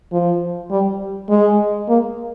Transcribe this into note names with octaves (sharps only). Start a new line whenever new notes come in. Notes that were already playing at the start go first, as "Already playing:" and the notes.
F3
G3
G#3
A#3